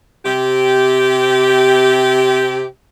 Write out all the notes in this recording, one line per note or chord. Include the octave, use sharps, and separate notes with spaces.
C3 G4